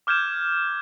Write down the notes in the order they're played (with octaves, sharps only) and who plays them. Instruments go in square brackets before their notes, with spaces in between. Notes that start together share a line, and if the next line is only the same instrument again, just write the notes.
[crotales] D6 F6 G6 G#6 E7